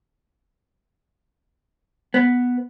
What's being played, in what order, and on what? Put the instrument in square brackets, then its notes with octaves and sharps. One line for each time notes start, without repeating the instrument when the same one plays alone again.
[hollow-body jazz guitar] B3